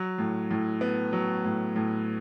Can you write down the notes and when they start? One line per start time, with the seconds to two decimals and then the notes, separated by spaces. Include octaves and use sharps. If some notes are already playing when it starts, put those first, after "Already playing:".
Already playing: F#3
0.18 A2
0.51 A2
0.81 B3
1.13 F#3
1.45 A2
1.76 A2